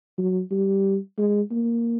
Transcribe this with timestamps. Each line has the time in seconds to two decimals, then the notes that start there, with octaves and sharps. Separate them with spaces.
0.18 F#3
0.51 G3
1.18 G#3
1.51 A#3